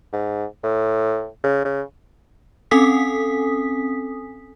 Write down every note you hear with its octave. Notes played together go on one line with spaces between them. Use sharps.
G#2
A2
C#3
C#3
C4 C#4 A4 G#5 D#6 B6